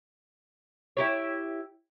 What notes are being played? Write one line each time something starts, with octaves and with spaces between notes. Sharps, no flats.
E4 G4 C#5